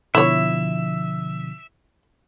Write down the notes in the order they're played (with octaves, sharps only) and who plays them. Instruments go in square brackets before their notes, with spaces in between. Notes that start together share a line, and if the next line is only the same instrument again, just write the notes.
[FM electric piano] B2 D3 F3 [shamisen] E4 C#5 [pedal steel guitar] E5